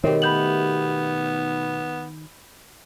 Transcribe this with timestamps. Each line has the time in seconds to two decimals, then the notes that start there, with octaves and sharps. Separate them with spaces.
0.04 B2 D#3 A3 C4 G4 A#4 C#5
0.22 B3 B5 G6 F#7